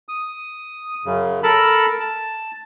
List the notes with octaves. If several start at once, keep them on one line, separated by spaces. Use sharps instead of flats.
D#6
F#2 C#3
A4 A#4 A5 B5
A5